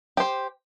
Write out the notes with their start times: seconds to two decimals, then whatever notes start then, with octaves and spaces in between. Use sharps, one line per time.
0.17 G4 C5